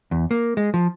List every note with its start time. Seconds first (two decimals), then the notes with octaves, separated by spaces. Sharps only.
0.11 E2
0.31 A#3
0.57 G#3
0.74 F3